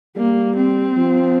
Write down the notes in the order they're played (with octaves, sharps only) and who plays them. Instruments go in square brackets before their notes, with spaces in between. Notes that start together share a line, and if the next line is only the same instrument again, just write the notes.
[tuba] G3 [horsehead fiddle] A#3
[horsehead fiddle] C4
[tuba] F3